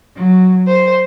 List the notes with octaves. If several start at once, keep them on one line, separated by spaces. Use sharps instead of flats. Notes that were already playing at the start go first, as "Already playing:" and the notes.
F#3
C5